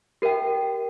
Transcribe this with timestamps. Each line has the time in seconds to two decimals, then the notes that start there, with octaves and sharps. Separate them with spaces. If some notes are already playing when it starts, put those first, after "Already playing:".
0.22 G4 A#4 E5 G5